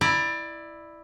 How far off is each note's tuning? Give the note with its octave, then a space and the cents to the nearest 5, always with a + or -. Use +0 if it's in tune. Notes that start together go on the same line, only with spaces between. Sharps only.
E4 +0 D5 +20 A#5 +0